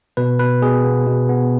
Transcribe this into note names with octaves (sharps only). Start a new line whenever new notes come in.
B2 B4
B2 B4
B2 G#4
B3
B2
B3